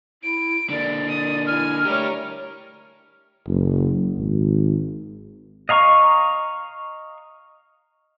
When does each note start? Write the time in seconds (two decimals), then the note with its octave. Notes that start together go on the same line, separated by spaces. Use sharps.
0.23 E4 D7
0.70 D3 A#3 D5
1.08 D#6
1.47 E4 G#5 F6
1.85 A3 G4 A#4 C#5 D5
3.47 F#1
4.18 G#1
5.69 D#5 F5 A#5 C#6